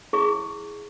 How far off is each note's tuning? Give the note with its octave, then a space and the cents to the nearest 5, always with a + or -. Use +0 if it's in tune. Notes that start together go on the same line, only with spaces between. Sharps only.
E4 -5 G#4 +0 C#6 +0